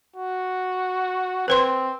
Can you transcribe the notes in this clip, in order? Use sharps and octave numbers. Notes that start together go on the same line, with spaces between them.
F#4
C4 B4 C5 C6